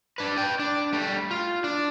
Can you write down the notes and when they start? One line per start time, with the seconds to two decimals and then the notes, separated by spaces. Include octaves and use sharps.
0.18 D4 B4
0.37 B4 G5
0.59 D4
0.93 G3 A3
1.31 F4
1.64 D4